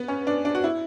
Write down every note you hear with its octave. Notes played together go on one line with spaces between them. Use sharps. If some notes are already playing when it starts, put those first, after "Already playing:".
Already playing: B3
C#4
D4
D4
F#4
E4